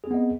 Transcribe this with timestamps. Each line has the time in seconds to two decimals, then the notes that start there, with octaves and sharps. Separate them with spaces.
0.04 G#4
0.07 C4
0.11 B3
0.14 D#5